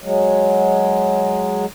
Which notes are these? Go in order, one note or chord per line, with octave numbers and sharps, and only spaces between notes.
F#3 G#3